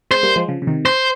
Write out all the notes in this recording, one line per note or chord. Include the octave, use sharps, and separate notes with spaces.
G#3 C4 C5
G3 A#3
F3 G#3
C#3 F3
C#3
C3 D#3
C5